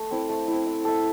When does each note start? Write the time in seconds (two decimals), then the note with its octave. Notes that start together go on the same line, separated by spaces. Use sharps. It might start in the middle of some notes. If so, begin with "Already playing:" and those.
Already playing: A3
0.11 C4 E4
0.29 A3
0.48 C4 E4
0.66 E4
0.85 A4 E5